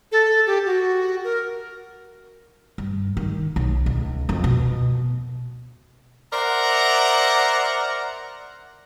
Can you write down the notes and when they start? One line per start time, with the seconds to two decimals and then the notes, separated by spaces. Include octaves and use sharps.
0.12 A4
0.47 G4
0.66 F#4
1.24 A#4
2.78 G2
3.17 D#3
3.56 B1
3.86 C#2
4.29 F2
4.44 B2
6.33 A#4 C5 D5 E5 F#5 A#5